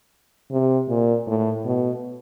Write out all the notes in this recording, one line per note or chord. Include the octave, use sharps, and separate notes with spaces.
C3
A#2
A2
B2